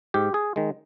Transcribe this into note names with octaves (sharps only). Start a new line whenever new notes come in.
G#2 G4
G#4
D#3 G#3